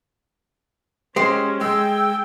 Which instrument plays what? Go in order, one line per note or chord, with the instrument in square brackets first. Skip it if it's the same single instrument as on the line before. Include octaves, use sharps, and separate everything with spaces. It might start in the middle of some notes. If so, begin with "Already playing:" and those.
[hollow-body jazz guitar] G#3 G4 C5 [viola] C#4
[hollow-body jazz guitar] G#3 [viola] G#4 G5 [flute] E6